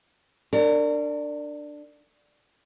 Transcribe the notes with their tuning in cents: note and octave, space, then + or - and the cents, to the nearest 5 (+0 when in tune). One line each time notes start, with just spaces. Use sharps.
D4 +10 A#4 -35 C#5 +0